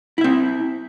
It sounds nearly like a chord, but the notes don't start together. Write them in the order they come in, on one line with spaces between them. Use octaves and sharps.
E4 E5 C4